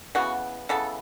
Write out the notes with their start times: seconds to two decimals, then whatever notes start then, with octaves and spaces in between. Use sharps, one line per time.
0.15 C#3 E3 B3 F#4
0.69 C#3 E3 B3 A4